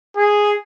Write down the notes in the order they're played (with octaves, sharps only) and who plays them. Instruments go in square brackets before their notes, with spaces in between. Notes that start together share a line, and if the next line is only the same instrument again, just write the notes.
[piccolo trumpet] G#4